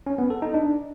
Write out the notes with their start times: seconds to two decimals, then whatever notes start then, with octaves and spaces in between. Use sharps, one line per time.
0.06 C#4
0.18 B3
0.30 A4
0.42 D#4
0.54 D4